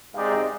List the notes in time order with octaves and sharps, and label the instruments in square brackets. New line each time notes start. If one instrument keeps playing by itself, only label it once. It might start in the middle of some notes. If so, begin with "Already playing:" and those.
[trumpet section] G#3 C4 D#4 G4 D5 [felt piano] F5
[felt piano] D#5